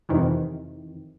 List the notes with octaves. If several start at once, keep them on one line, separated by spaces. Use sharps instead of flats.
F2 C3 D#3 E3